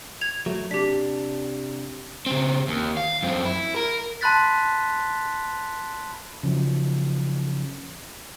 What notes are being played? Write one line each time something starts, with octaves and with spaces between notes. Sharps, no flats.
G#6 F7
F#3 A3
C3 D4 G4 B6
C#3 C4
D#2
F5
F#2 C4
E4
A#4
A5 B5 C6 F#6 A6 B6
C#3 F3 F#3